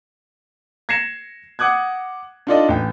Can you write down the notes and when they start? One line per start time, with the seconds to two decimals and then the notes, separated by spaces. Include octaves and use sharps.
0.89 G#6 A#6 C7 C#7 E7
1.59 F#5 D6 D#6 F#6 G#6
2.47 D4 D#4 F4 A4 D5 D#5
2.69 A1 G5